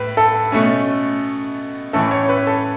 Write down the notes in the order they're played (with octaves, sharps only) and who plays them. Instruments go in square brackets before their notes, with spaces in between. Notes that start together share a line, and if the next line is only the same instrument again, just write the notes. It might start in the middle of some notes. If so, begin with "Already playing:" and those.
Already playing: [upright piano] A2 B4
A4
B2 A3 C#4
A2 E3 A3 C#4 A4
C#5
B4
A4